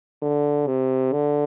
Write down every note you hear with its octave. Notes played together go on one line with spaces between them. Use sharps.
D3
C3
D3